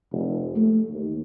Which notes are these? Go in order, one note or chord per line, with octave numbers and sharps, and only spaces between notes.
F1
A3
D#2